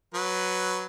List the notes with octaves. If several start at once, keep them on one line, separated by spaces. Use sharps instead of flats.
F#3 B4